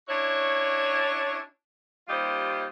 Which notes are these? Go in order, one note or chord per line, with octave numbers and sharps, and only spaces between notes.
C#4 D4 E4 F#4 C#5
D#2 G3 F4 G4 C5 D#5